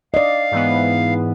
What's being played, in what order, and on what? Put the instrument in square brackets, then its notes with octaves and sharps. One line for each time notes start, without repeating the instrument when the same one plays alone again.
[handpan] D5 D#5 [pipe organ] F5
[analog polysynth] G#2 E3 B3